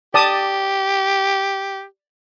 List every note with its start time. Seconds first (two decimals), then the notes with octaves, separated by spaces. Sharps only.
0.14 G4 D5 A5 D#6